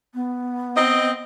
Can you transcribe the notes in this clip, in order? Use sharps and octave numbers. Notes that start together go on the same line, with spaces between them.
B3
C4 D#5